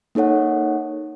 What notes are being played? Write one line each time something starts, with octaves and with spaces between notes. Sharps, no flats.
A#3 D#4 A4 C#5 F#5